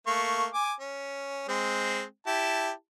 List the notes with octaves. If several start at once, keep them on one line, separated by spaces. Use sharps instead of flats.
A3 A#3 C#6
G#5 D6
C#4
G#3 C4
E4 G4 A5